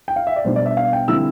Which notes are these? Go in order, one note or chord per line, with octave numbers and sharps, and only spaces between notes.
G5
F5
E5
D5
B2 G3 D4 C5
D5
E5
F5
G5
D3 G3 C4 E4 E6